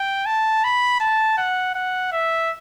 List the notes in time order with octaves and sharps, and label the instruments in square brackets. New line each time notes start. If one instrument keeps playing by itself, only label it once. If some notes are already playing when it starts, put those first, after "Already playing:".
Already playing: [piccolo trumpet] G5
A5
B5
A5
F#5
F#5
E5